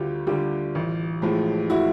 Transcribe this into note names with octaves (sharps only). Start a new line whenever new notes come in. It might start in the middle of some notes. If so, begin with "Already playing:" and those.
Already playing: D2 D3 G3 F4 G4
D3 G3 F4 G4
A1
A2 F3 G#3
E4 F#4